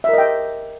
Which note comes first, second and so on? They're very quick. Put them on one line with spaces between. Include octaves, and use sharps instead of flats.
E5 A#4 D#5 G5